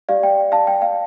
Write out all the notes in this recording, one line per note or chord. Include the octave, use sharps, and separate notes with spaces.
G4 D5 F5
G5
F5 A5
G5
F5